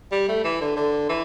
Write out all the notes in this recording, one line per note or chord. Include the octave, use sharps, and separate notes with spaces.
G3
A3
E3
D3
D3
E3